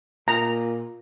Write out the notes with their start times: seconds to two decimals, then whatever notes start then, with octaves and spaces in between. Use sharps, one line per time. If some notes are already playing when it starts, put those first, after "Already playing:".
0.28 A#2 A#5